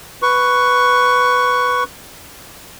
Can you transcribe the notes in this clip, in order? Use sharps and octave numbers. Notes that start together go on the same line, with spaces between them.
B4 C#6